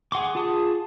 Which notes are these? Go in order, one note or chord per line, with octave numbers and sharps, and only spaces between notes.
G#4 F#5 C6 D6
F4 G#4 A5 D#6